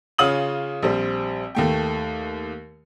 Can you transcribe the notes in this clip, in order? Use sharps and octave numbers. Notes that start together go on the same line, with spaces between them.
C#3 C#4 F4 D#6 F#7
A#1 G3 C4
D#2 A3 G5